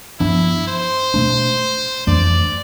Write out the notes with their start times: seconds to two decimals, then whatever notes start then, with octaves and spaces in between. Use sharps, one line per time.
0.20 G2 F3 B3 D4 E4
0.68 C5
1.14 B2 A3 D4
2.07 F2 E3 A3 D4 D5